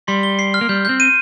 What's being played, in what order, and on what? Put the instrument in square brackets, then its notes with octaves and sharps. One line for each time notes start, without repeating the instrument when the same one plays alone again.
[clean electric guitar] G3 [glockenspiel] C6
[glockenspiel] G7
C7
F6
[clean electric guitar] A#3
[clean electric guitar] G3 [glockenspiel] G6
[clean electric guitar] C4 [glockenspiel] G6
[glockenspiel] D#7